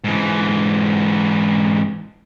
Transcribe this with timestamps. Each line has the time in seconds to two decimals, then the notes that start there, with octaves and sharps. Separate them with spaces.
0.04 G#2 E3